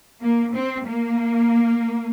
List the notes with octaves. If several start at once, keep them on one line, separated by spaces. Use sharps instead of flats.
A#3
C4
A#3